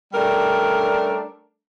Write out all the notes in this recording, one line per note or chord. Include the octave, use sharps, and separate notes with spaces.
G3 A3 C#4 D4 A#4